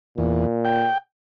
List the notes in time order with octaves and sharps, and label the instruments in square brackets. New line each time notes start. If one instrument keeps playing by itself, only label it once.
[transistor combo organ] E2 [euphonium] A#2
[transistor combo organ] G5